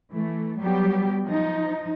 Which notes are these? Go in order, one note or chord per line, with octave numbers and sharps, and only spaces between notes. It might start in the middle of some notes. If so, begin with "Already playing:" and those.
E3 A3
F#3 G3 B3 G4
F3 D#4